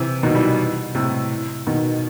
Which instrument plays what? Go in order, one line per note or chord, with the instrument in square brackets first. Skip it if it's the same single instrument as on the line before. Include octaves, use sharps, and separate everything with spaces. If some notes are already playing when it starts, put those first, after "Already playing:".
Already playing: [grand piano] C3 E3
B2 D#3
E3 G3
A2 C3
B2 D#3